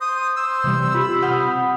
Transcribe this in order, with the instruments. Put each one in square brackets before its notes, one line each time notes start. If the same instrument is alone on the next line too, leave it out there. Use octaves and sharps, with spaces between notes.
[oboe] C5 [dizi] D#6
[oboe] C5 [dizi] E6
[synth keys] C3 E3 G3
[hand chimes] F4 G4 [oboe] B5
[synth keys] C3 F6 G6 [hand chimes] F#5 D#6